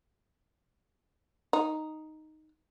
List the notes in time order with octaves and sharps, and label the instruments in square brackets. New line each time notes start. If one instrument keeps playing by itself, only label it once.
[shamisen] D#4